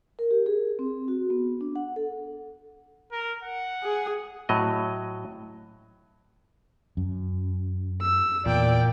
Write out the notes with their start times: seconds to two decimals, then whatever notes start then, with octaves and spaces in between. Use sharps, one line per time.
0.19 A#4
0.31 G4
0.46 G#4
0.79 C4
1.08 F#4
1.30 B3
1.61 D4
1.76 F#5
1.96 A4
3.12 A#4
3.44 F#5
3.83 G#4
4.49 A2 F#3 D#5
6.97 F#2
8.02 E6
8.46 E2 A#2 D5 G5